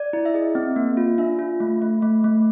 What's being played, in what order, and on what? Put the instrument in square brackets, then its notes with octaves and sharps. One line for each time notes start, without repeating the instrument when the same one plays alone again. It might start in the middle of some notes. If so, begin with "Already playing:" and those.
Already playing: [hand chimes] D5
E4
E5
G#4 D#5
C4
A#3
F4
D4 E5
F4
A3
A3
A3
A3